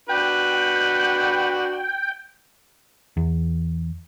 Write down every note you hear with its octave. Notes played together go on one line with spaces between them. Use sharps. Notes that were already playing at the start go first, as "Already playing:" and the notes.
D4 F#4 B4 G5
E2